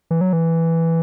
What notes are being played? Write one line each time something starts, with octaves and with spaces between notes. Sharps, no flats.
E3
F#3
E3